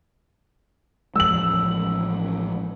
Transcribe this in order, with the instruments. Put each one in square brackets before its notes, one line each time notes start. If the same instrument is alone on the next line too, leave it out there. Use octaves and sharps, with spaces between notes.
[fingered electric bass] A1 F3 G#3 [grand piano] E6 F#7